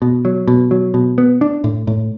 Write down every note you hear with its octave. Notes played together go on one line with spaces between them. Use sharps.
B2
F#3
B2
F#3
B2
B3
D4
A2
A2